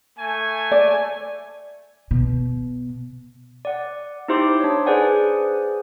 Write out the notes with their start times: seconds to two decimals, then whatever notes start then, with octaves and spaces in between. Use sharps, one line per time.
0.19 A3 G#5
0.71 D5
2.11 B2
3.65 D5 F#5
4.28 D#4 E4 G4 C5 C6 D6
4.60 D4 C#5
4.86 G#4 B4 C5 D5 F#5 G#5